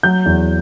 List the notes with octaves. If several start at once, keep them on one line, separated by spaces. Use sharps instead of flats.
F#3 G6
E2